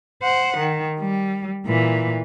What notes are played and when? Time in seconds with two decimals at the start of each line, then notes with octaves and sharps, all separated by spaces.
0.22 C5 F#5
0.58 D#3
0.99 G3
1.66 A#2 E3